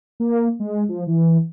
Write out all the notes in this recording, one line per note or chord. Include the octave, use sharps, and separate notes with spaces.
A#3
G#3
F3
E3